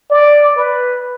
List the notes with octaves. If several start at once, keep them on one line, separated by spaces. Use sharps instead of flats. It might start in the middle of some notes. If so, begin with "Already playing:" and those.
D5
B4